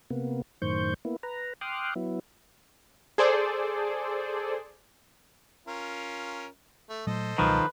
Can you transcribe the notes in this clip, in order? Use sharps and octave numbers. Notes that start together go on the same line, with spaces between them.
C3 A#3 B3
F#2 A2 D#3 C5 C#6 G6
A#3 B3 E4
B4 A#5
G5 C6 D6 D#6 F6 F#6
F#3 B3 E4
G#4 A4 C5 D5
C#4 F4 A#4
A3
A#2 F#3 A3 A4 C5 D#5
C#2 B2 D#3 F3 F#3 B4